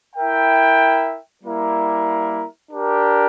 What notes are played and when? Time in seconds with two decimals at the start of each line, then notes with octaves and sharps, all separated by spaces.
0.16 E4 A#4 E5 G5
1.43 G3 A#3 E4 A#4
2.72 D4 G4 A#4